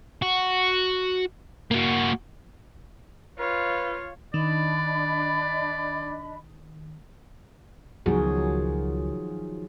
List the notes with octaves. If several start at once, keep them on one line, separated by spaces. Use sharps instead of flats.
F#4
A#3 F#4
F4 B4 C#5
D#3 D4 D5 D#5 B5
C#2 D#3 F3 F#3 B3 F#4 G#4 A#4